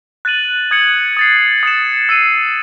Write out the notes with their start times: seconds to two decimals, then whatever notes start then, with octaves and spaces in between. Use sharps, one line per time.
0.25 F#6 A6 D#7 F#7
0.71 D#6 G#6 C#7 F#7
1.17 D#6 A6 C7
1.63 D#6 A6 C#7 E7
2.09 E6 C7 D#7